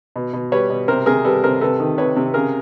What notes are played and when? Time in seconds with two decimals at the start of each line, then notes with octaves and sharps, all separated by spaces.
0.16 B2
0.33 B2
0.52 G3 B4 C#5
0.70 B2
0.88 C3 A#4 C5
1.06 C3 G#4 A#4
1.25 G3 A4 B4
1.44 C3 A#4 C5
1.61 C3 A4 B4
1.80 D#3
1.98 C3 B4 C#5
2.16 C3
2.34 C#3 G#4 A#4